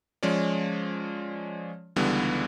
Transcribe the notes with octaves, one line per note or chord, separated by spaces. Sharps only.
F3 G#3 C#4 C#5 D5
C#2 D3 E3 G3 B3